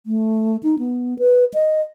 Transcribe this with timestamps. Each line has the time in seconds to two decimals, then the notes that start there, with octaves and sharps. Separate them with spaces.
0.06 A3
0.63 D#4
0.79 B3
1.19 B4
1.54 D#5